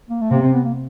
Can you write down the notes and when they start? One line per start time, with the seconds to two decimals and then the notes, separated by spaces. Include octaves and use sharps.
0.09 A#3
0.21 A3
0.31 C3 A#3
0.42 C4
0.53 B3
0.65 A#3